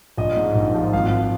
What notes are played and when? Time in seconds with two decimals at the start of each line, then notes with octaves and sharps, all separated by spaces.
0.17 A#1 D#5
0.36 G#2
0.55 A#1
0.74 F3
0.93 G#1 F5